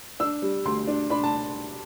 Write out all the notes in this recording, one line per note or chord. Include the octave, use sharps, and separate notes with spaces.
D4 E6
G3
D2 C6
D4
D4 B5
A5